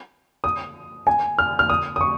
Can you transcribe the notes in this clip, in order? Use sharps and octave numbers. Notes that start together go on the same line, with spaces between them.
D#6
G#5
F6
F6
D#6
D#6
C#6